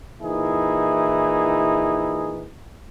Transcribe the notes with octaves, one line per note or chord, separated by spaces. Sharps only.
A#2 E3 D#4 E4 G#4